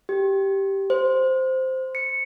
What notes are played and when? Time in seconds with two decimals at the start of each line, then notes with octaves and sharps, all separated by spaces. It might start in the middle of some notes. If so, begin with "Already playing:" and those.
0.09 G4
0.90 C5
1.95 C#7